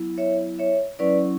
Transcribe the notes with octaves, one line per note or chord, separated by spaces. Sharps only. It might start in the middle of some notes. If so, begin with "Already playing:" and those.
Already playing: F#3 B3 E4
C#5 E5
C#5 E5
F#3 C#4 E4 B4 D5